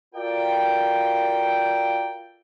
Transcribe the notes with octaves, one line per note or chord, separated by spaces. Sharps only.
F4 F#4 A4 A#4 D5 G5